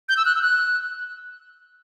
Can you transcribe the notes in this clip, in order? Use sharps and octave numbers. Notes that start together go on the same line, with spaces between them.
G6
E6
F#6
E6
F#6